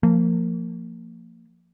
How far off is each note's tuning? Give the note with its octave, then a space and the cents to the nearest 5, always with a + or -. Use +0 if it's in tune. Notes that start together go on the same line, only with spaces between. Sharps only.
F3 +0 A#3 -25